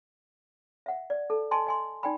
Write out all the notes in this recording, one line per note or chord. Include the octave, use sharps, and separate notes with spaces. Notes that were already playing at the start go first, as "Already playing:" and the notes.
E5 F#5
D5
A4 A5
D#5 G#5 A5 C6
D#5 G#5 C6
D#4 D5 G5 G#5 B5